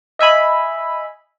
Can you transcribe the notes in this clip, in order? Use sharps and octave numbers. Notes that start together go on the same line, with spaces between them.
D#5 E5 G#5 B5